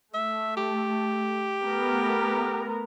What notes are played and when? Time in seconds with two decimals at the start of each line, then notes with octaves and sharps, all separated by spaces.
0.14 A3 E5
0.57 G4
1.63 A3 B3 A#4